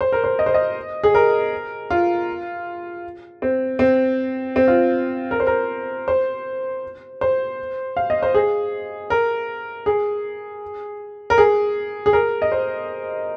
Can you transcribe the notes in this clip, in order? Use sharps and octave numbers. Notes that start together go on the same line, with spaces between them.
C5
A#4
C5
D#5
C5
D#5
G#4
A#4
F4
C4
C4
C4
F4
A#4
C5
A#4
C5
C5
F5
D#5
C5
G#4
A#4
G#4
A#4
G#4
G#4
A#4
D#5
C5